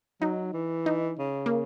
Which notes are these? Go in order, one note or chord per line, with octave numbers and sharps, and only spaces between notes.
F#3 D#4
E3
D#4
C#3
A#3